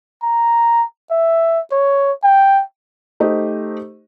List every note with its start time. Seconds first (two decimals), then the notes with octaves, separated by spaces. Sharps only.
0.23 A#5
1.11 E5
1.72 C#5
2.23 G5
3.20 A3 D#4 G4 C5 D#5